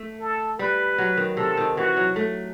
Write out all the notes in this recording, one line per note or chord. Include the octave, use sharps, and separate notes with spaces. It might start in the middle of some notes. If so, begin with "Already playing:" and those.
Already playing: A3
A4
G3 B4
F#3
D#3
C3 A4
D#3
E3 F#4
F#3
A3